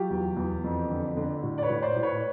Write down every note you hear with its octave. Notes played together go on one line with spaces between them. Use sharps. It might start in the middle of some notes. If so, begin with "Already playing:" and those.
Already playing: F#3 F4 G4
E2
E2
F2
D3
D3
A2
D5
B4 C#5
A2
C5 D5
A2
B4 C#5